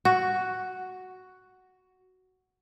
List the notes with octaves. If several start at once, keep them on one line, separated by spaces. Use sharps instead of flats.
F#4 F#5